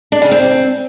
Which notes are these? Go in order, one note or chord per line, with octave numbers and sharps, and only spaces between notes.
D4
C#3
C4